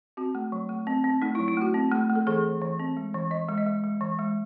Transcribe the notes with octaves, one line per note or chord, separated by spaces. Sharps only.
C4 F#4
A3
F#3
A3
C4
C4
A3 D#4
E4
F#3
E4
A3 F#4
C4
A3
A3
A4
E3 G#4
E3
E3
C4
G#3
E3
E3 D#5
G#3
D#5
G#3
G#3
E3
G#3